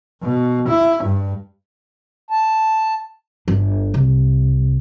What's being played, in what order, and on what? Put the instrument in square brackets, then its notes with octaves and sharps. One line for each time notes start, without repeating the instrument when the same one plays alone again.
[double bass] B2
E4
G2
[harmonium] A5
[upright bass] G1 D4
C2